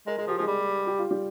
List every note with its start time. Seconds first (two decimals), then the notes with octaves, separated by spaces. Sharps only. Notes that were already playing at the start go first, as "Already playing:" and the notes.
0.07 G#3 A#4
0.18 G#3 G#4
0.27 F3 G4
0.38 F3 G#3 G#4
0.47 G3
0.87 G4
0.99 F4
1.11 G3 G4